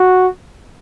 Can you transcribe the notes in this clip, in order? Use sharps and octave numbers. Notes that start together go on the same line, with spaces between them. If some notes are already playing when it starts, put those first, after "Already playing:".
Already playing: F#4